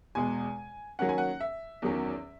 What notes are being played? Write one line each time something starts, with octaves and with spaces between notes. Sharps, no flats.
E2 B2 G#3 G#5
D#3 F#3 A#3 C#4 F#5
G#5
F#5
E5
E2 D#3 F#3 C#4